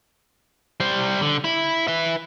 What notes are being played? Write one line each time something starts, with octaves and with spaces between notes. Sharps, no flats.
G3 C5
D3
E4
B4 E5